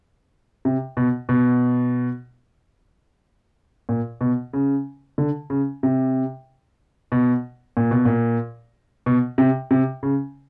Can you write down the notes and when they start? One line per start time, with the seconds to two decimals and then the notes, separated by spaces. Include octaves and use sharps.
0.65 C3
0.97 B2
1.29 B2
3.89 A#2
4.21 B2
4.53 C#3
5.18 D3
5.50 C#3
5.83 C3
7.12 B2
7.77 A#2
7.91 B2
8.05 A#2
9.06 B2
9.38 C3
9.71 C3
10.03 C#3